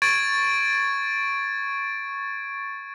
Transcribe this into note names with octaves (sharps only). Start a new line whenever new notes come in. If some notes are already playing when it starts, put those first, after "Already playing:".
C#6 G#6 A6 D7